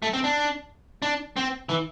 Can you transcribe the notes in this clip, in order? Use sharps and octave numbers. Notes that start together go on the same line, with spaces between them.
A3
C4
D4
D4
C4
E3